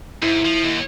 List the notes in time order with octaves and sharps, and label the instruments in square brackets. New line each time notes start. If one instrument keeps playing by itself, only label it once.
[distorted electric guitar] G#2 [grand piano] E4
[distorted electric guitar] F3
D#2